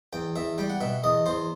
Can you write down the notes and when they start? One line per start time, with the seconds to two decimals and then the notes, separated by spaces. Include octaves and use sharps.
0.13 E2 G5
0.36 E2 E5
0.58 G3 G5
0.70 F#5
0.81 B2 E5
1.04 E2 D#5
1.26 E2 C5